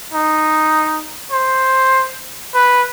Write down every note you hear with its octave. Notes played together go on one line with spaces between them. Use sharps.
D#4
C5
B4